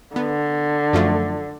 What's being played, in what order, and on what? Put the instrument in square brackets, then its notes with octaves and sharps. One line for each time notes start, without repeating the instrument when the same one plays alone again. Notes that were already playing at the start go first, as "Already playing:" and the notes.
[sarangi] D3 [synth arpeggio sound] B3
[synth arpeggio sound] F#2 F3 A3